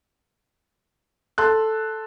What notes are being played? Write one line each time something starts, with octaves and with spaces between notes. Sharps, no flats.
A4 A5 C6 F#6